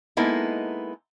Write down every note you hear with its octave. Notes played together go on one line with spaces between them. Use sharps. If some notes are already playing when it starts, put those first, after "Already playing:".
G#3 A#3 B3 D#4 E4 A4